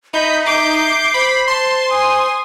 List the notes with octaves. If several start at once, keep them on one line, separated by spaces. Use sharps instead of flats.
D#4 E5 B5 G6
D6 G6 C7
C5 B5
A5 C6
G#5 D#6